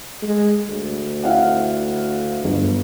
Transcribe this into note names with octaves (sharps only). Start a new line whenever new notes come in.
G#3
D2
E4 F5 F#5
G1